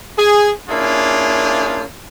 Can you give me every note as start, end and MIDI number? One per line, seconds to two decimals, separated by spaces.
0.17 0.50 68
0.69 1.83 58
0.69 1.83 61
0.69 1.83 62
0.69 1.83 64
0.69 1.83 65
0.69 1.83 68